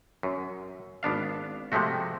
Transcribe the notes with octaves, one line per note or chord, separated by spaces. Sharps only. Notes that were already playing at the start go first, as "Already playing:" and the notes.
F#2
G#1 B3 D4 F5
C3 F3 G#3 A3 F#4